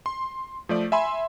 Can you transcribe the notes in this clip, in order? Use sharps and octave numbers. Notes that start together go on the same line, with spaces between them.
C6
F3 A3 D5
E5 G#5 B5 C6